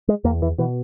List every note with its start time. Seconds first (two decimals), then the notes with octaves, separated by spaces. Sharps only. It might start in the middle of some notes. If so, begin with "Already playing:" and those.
0.08 G#3
0.24 E2 A#3
0.42 E3
0.58 B2 E3